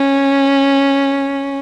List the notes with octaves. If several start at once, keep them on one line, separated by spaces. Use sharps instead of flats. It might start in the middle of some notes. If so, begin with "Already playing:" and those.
Already playing: C#4